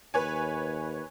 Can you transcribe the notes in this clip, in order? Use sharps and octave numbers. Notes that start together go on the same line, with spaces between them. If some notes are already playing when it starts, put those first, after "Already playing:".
D#2 B4 C#5 G#5